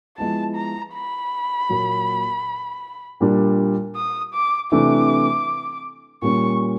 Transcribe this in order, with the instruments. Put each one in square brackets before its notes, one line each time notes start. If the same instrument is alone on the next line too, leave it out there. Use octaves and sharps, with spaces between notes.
[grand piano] F3 G#3 B3 E4 [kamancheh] A5
[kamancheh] A#5
B5
[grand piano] A#2 F#3 A#3
A#2 G3 A#3 D4
[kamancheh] D#6
D6
[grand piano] C3 E3 A3 D4 [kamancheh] D6
[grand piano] A#2 G3 A#3 C#4 [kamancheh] C#6